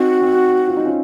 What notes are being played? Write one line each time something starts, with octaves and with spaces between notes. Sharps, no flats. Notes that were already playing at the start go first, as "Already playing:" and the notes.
Already playing: C4 D#4 F#4
C4 D#4
F4
D#4
C#4 F4